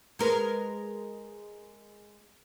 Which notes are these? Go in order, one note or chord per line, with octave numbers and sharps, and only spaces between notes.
G#3 A#4 B4